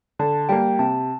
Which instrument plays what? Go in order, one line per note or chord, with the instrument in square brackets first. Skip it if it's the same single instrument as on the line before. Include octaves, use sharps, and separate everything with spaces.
[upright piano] D3 [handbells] A5
[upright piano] G3 A#3 [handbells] G5
[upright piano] C3 [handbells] A5